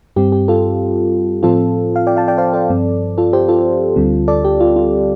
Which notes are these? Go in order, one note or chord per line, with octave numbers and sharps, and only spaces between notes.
G2 G3 C4 G4
G4
F4 A4
A2 F3 C4 F4 A4
F5
D5 G5
F5 A5
D5 G5
C5 F5
A4 D5
G2 F3 C4
F4 A4
G4 C5
F4 A4
D2 D3 G3 C4
A4 D5
G4
F4
F4